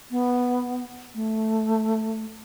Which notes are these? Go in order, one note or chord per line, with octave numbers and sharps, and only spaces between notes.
B3
A3